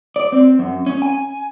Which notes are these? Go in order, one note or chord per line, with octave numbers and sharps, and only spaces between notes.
D5
C4
F#2
C#4
G#5